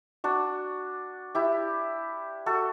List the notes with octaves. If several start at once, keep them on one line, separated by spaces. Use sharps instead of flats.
D4 F#4
E4 G4
F#4 A4